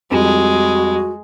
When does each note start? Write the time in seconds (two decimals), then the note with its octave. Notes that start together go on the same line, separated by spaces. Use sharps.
0.11 F2 G3 G#3 F#4